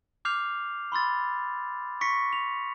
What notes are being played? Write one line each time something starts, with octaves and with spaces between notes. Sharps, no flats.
D6 F6 G6 C7 F7
B5 C6 E6 A6
C#6 A#6 B6 C#7
F7